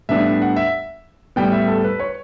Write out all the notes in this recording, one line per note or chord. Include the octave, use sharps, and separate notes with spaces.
A2 G3 B3 D4 E5
F#5
E5
A2 G3 B3 G5
E5
A4
B4
C#5